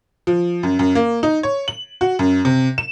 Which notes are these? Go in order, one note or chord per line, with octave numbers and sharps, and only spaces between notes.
F3
F#2
F#2
A#3
D#4
C#5
F#7
F#4
F#2
C3
E7